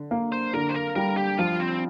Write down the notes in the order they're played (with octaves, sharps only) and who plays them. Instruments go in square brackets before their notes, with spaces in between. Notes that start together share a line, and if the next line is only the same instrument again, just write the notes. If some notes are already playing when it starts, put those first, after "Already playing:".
Already playing: [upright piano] D3
A#3
[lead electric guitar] C5
[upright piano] D3 [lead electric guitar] A#4
[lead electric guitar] C5
A#4
[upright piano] G3 [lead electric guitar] A#4
[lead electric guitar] G4
[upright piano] F3 [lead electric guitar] F4
[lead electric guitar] C4